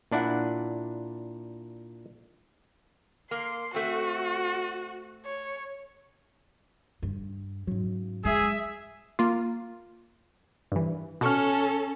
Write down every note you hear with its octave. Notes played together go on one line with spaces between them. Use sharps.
A#2 D4 E4 F#5
A#3 C6
A3 C4 F#4
C#5
G2
G#2 C#3 F#3
G#3 G#4 E5
A#3 F4
G2 E3
B2 C#4 A4 C#6 F6